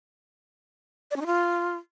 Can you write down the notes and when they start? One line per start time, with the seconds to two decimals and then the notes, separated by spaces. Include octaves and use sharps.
1.11 D5
1.16 C#4
1.21 D#4
1.26 F4